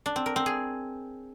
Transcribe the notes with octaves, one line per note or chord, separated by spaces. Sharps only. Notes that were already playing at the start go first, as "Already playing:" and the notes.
D4
C4
A#4
C4
G#4